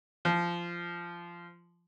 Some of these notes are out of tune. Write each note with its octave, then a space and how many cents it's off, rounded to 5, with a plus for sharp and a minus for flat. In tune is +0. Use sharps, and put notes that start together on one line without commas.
F3 -15